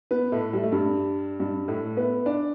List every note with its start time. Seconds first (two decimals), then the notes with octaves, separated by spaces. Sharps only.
0.11 B3 B4
0.32 A2 A3
0.53 G3
0.63 A3
0.72 G2 G3
1.40 G2 G3
1.68 A2 A3
1.97 B3 B4
2.26 D4 D5